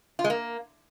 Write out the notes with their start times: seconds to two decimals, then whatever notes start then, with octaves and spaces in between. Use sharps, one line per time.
0.19 F4
0.24 G#3
0.30 A#3